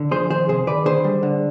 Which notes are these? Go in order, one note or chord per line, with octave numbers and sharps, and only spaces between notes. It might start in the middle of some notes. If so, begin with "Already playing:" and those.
Already playing: D3
F3 G#4 C5
D#3 G#4 C5
C3 G#4 C5
D#3 B4 D5
D3 G#4 C5
G3
D3